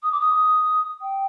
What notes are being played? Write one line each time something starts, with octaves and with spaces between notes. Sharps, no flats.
D#6
D6
D#6
G5